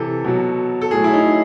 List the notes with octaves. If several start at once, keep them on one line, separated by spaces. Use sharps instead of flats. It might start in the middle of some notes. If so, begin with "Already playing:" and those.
Already playing: C3 E3 A4
B2 F#3
A4
A2 F#3 G#4
E4
D#4